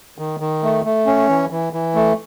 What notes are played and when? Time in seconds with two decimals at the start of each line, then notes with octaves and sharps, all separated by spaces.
0.18 D#3
0.40 D#3
0.63 A3
0.85 A3
1.06 C#4
1.29 E3
1.51 E3
1.73 E3
1.95 A3